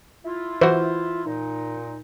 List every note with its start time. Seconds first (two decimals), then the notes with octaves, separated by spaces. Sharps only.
0.25 E4 F4
0.61 E3 F#4 C5
1.25 A#2 D#4